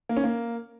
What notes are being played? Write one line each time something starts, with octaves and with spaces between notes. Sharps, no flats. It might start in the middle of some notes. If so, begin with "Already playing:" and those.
A#3
C#4
A#3